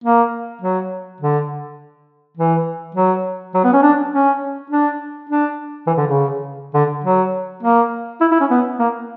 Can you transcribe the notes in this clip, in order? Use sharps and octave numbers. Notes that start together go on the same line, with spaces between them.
A#3
F#3
D3
E3
F#3
F#3
B3
C#4
D4
C#4
D4
D4
E3
D3
C#3
D3
F#3
A#3
E4
E4
C#4
B3
A#3